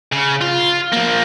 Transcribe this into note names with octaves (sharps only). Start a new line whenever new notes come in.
C#3
F4
F3 A#3